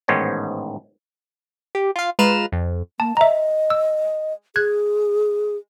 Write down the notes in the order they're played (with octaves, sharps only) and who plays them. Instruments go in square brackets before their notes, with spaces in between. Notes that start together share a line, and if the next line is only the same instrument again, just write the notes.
[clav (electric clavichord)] A1 G#2 D#3 B3 C5 C#5
[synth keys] G4
F4 F5
G#3 F4 B4 A#5 F6 E7
F2
[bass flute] A#3 [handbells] A5
[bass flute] D#5 [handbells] E5 A#5
[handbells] E6
[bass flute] G#4 [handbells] F#6 G#6